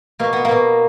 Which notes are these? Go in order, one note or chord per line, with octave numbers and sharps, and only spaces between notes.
B2 A#3
B3
A#3
B2